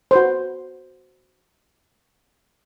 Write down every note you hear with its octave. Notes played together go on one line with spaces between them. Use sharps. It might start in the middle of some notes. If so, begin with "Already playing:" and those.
F#4 B4 C5